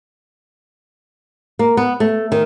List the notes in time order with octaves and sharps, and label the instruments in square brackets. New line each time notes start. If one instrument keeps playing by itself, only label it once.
[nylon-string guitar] A#3
B3
A3
D#3